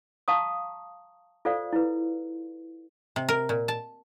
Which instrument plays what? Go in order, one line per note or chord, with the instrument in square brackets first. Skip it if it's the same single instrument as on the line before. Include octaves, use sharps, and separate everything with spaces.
[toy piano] F5 A5 A#5 C#6 D#6
F4 A4 C5 D5 F5
E4 F4 B4
[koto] C3
A#4
A#2
A5